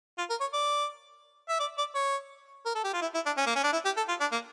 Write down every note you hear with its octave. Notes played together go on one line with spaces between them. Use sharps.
F4
A#4
C#5
D5
E5
D5
D5
C#5
A#4
A4
G4
F4
E4
E4
D4
C#4
A#3
C#4
D4
E4
G4
A4
F4
D4
A#3